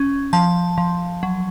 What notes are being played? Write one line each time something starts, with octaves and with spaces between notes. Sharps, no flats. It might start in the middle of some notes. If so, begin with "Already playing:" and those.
Already playing: C#4
F3 A5
F3
F#3